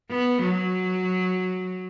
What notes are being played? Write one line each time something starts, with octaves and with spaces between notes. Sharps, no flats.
B3
F#3